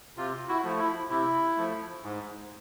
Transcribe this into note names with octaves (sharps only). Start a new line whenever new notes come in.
C3 F4
E4 F#4
F3 A3
E4
C3 E4
F3 A3
G#2